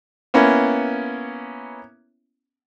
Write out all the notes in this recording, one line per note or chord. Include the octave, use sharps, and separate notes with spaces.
A#3 B3 C#4 E4